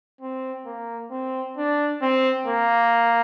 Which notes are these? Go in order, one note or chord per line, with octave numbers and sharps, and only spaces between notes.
C4
A#3
C4
D4
C4
A#3